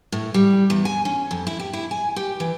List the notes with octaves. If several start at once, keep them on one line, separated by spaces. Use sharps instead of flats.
A2
G3
E2
G#5
C#4
F2
E4
G4
E4
G#5
G4
E3